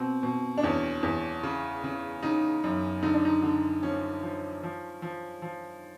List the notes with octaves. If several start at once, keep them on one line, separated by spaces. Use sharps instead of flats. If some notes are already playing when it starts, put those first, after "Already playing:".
Already playing: B2 C4
B2
D4
E2 C#4
E2
C#3
C#3
C#3 D#4
F#2
D3 D#4
D4
D#4
D3
F3 C#4
F3
F3
F3
F3